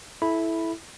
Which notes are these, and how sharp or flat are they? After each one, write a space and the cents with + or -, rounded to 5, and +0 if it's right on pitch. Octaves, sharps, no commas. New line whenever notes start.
E4 -5 A4 -20 B5 +0